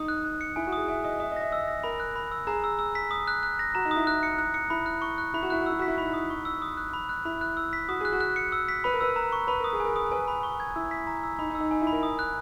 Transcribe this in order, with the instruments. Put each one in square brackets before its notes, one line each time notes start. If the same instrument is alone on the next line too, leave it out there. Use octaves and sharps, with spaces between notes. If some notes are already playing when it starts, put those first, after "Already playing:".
Already playing: [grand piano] D#4 [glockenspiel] D#6
[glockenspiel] F#6
F#6
C#7
[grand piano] E4 [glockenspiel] G#5
[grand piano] F#4
[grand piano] G#4 [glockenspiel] D#6
[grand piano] E5 [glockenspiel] G#5
[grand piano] D#5 [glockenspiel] D#6
[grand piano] E5 [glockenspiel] D#6
[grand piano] D#5
[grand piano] E5 [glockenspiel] A#6
[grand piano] D#5 [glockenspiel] E6
[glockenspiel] A#6
[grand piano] A#4 [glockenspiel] B5
[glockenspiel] F#6
B5
E6
[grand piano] G#4 [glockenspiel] A#5
[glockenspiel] E6
E6
B6
D#6
F#6
F#6
A#6
[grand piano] F#4 [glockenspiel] A#5
[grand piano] D#4
[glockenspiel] D#6
[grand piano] E4
[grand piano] E4 [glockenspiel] F#6
[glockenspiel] C#7
F#6
C#7
[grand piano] E4 [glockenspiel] B5
[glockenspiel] F#6
C#6
F#6
[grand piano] E4 [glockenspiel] B5
[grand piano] F#4
[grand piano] E4 [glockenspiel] F#6
[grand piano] F#4
[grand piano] E4 [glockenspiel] E6
[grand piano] F#4 [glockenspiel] B6
[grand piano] E4
[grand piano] D#4 [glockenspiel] B5
[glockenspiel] D#6
C#6
E6
D#6
F#6
B5
F#6
[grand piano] E4 [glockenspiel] B5
[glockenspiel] F#6
E6
B6
[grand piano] F#4 [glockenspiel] D#6
[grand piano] G#4 [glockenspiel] F#6
[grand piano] F#4
[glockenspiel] F#6
C#7
E6
B6
[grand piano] B4 [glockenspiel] B5
[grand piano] A#4
[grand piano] B4 [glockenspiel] E6
[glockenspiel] A#5
C#6
[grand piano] B4 [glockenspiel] B5
[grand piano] A#4 [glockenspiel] D#6
[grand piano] G#4
[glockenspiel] G#5
[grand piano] A#4
[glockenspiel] D#6
[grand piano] B4 [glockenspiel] G#5
[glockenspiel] B5
C#6
G#6
[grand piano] E4 [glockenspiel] E6
[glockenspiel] B6
A#5
E6
[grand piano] D#4 [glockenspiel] B5
[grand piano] D#4
[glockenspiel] E6
[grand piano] D#4
[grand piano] D#4 [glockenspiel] G#5
[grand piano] E4
[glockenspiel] B5
[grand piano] A#4
[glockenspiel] D#6
F#6